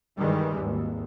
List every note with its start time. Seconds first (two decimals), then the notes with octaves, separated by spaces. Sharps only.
0.19 G2 D#3 E3 G3 G#3
0.57 G#1 D#2